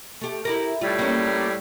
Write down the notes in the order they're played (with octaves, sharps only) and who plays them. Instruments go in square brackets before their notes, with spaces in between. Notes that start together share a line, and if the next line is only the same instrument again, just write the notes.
[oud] A3 G4
E4 G4 A#4
[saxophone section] A2 G3 [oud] F4
[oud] A#3 C#4